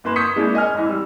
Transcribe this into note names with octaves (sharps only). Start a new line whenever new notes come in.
G1 A#3 B4 C6 E7
C#6 D#6 G6 G#6 B6 C#7
G#3 A#3 D4 E4
D#5 G#5 F6
G#1 E3
G3 E6